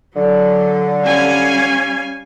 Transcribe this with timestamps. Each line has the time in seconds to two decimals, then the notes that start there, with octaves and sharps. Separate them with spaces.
0.15 D3 F#3
1.04 G3 C#4 F5 G#5